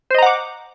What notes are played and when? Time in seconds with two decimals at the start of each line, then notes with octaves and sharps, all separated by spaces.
0.11 C5
0.15 D#5
0.18 A#5
0.22 F#5
0.26 D6